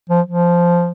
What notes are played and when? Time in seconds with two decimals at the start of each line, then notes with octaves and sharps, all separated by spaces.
0.10 F3
0.26 F3